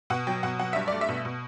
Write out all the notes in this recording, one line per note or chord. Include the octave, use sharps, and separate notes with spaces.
B2 F#5
F#3 G5
B2 F#5
F#3 F#5
G2 E5
A3 D5
E5
B2
B2